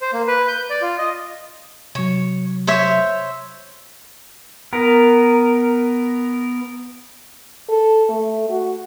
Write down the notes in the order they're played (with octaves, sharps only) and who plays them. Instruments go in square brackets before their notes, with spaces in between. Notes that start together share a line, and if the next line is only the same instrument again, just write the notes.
[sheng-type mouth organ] C5
A#3
B4
G6
D5
F4
D#5
[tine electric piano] C3 F#3 [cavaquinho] C#5
[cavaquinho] C5 C#5 E5
[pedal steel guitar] B3 A#4
[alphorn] A4
A3
F#4